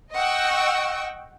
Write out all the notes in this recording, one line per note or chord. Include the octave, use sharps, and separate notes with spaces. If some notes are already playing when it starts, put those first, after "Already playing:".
D#5 F#5 G5 C#6 E6